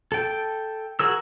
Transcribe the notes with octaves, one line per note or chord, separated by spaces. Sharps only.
A4 G5
F#4 G#4 A#4 E6